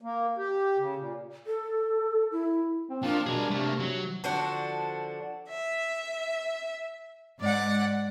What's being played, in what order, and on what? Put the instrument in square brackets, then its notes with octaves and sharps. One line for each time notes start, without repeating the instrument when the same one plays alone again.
[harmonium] A#3
G4
C#3
A#2
[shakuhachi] A4
E4
[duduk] C4
[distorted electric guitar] F3 [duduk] A#3 [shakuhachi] D4
[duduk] B2 [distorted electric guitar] G#4 A#4
[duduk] G3
[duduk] C3 [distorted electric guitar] A3 A#3
[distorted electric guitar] F#3
[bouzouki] D3 F3 D4 F#4
[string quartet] E5
G#2 D5 F#5